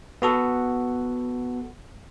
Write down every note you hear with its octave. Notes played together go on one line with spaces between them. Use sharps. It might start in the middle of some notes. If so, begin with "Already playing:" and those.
B3 F#4 A4